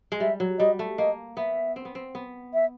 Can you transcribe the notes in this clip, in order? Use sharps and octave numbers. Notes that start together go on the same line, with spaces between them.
G#3
G3 E5
F#3
G3 D#5
A3
A#3 D#5
B3 E5
C4
B3
C4
B3
E5